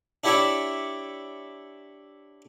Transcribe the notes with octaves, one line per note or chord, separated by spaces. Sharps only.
D4 E4 G4 C#5 D5 E5